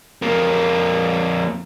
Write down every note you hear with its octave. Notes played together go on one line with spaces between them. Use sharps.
F2 A#3